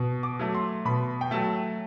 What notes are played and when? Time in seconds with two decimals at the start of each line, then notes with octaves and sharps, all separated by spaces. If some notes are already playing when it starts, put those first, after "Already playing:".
Already playing: B2
0.23 D6
0.39 F#3 A3
0.54 C6
0.85 B2 B5
1.21 G5
1.31 F#3 A3 A5